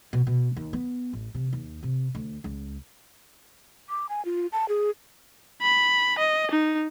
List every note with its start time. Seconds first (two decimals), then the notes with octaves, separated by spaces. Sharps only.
0.13 B2
0.27 B2
0.57 D#2
0.73 B3
1.13 A1
1.35 C3
1.53 D#2
1.83 C3
2.15 D2
2.44 C#2
3.89 D6
4.09 G#5
4.25 F4
4.52 A5
4.69 G#4
5.62 B5
6.18 D#5
6.51 D#4